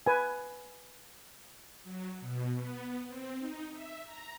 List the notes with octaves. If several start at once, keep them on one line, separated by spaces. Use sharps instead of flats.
B4 G#5
F#3
B2
B3
C4
D#4
E5
A#5